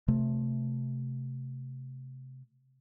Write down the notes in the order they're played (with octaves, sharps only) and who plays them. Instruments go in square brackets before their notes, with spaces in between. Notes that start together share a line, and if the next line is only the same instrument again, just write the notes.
[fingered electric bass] C3 A3